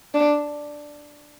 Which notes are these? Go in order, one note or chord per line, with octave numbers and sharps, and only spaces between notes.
D4